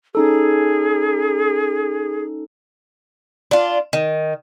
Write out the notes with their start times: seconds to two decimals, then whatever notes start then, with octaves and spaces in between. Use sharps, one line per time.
0.15 C#4 D#4 G#4 A4
3.51 D4 F4
3.93 D#3